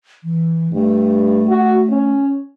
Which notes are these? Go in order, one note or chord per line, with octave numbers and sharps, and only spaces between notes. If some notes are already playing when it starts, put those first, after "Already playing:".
E3
G2 A3
F#4
C#4